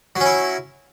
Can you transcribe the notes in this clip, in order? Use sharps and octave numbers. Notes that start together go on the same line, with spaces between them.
F#3 C#4 E4